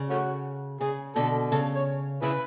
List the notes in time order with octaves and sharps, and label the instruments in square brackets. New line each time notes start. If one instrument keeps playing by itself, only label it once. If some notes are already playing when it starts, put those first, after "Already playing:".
Already playing: [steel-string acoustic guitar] C#3
[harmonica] A3 C#4 F#4
[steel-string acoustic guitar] C#3 [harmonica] G#4
[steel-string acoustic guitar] B2 D3 [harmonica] A4
[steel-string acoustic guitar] C#3 [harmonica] A4
[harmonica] C#5
[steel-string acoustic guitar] C#3 [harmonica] E4 G#4 B4